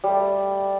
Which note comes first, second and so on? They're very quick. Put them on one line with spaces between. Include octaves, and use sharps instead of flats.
G3 A3 A4